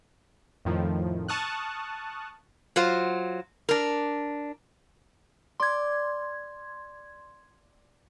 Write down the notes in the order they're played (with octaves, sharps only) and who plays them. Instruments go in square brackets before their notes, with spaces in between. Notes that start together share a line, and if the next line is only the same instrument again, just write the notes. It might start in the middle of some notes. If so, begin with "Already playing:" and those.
[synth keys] F2 A2 D#3 F3
A5 C#6 D#6 F6 F#6
[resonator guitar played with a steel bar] F#3 F4 C5
D4 A#4
[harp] D5 [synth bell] C6 G#6